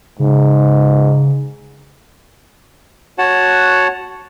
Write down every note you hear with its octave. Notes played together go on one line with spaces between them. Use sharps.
G#2 C#3
F#4 C#5 F#5 A5